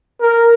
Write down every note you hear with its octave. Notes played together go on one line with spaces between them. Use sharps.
A#4